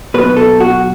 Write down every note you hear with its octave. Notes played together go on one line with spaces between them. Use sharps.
B1 B2 B4
A4
F#4